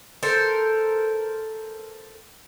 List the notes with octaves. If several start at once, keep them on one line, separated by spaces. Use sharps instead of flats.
A4 A#4 C5